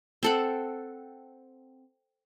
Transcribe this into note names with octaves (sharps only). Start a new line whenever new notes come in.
C4 A4 F#5